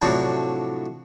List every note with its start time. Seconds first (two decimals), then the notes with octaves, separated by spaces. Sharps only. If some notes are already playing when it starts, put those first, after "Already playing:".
0.02 A2 C3 F3 F#3 D4